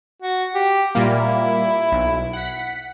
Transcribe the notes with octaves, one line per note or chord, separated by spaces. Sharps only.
F#4
G4
A#2 G3 A#3 E4
B1
F#5 B6